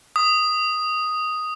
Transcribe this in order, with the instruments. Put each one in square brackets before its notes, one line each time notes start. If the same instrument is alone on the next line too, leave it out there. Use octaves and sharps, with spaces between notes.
[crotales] D#6